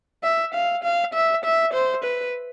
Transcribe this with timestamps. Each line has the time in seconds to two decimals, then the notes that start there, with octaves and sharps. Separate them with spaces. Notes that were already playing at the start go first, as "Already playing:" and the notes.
0.24 E5
0.54 F5
0.84 F5
1.14 E5
1.44 E5
1.73 C5
2.04 B4